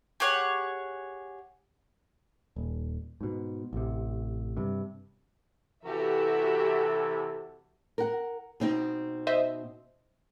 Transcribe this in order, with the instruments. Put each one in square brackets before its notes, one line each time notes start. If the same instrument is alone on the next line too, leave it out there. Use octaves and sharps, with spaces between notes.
[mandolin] G4 G#4 C#5 F#5
[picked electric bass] D#1
G#2 B2
A1 C3
G2 C3
[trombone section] C3 E3 [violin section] F#4 G4 E5 [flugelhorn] A4
[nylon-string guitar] A#4 F#5
B2 C4 D#4
[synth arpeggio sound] C5 D#5 E5